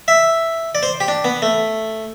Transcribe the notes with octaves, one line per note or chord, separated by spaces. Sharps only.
E5
D5
C5
G4
D4
B3
A3